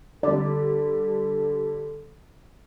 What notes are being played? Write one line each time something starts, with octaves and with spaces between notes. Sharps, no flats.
D3 G3 A4 D5